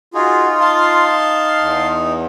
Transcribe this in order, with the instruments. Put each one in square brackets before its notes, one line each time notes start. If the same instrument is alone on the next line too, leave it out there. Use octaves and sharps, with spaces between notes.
[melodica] D#4 [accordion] F4 [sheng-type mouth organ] F#4 G#4
[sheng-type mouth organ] F5 A5 C6
[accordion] E2